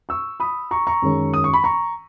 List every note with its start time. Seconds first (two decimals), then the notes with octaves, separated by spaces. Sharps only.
0.09 C#6 E6
0.40 B5 D#6
0.71 A#5 C#6
0.87 A#5 C#6
1.02 F#2 D#3 G#3 C#4
1.34 D#6
1.44 C#6
1.53 B5
1.64 A#5 C#6